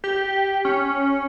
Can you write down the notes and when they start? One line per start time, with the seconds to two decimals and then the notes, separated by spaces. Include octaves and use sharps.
0.04 G4
0.65 C#4